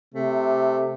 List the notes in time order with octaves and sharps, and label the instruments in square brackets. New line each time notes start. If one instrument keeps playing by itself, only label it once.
[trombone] C3 [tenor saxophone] A3